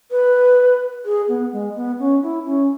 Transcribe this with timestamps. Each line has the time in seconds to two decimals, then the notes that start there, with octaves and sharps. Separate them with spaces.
0.11 B4
1.05 G#4
1.28 B3
1.53 G#3
1.76 B3
1.99 C#4
2.23 E4
2.46 C#4